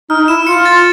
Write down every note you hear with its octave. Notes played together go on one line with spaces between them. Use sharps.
D#4 F6
E4 E7
F4 C#7
A6